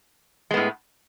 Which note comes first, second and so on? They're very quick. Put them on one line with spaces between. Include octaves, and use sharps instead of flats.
G#3 B3 A2